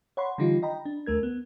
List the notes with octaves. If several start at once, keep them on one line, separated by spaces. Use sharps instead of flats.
C#5 F#5 B5 C6
D3 E3 G3 D#4 F4 G4
D#5 G5 A#5 B5
D4
D#2 A3 A#4 G#6
B3